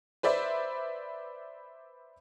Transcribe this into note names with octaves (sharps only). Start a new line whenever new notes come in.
B4 C5 D5 E5